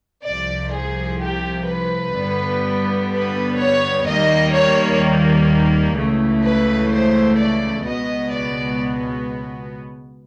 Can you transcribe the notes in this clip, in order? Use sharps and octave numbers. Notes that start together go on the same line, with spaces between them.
C2 C3 F3 D5
G#4
G4
B4
G2 D3 G3 B3
B4
C#5
D#2 D#3 G3 A#3 D#5
C#5
C#2 C#3 E3 A3
B4
C5
D5
C#2 B2 G#3 B3 D#5
D5